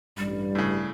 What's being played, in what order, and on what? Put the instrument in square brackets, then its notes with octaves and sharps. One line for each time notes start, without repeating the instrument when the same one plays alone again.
[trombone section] A1 G2 [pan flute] G3
[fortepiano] A2 C#3